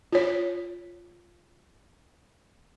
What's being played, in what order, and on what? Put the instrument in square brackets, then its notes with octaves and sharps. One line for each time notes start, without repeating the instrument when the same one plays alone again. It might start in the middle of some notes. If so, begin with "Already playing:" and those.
[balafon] F4 C#5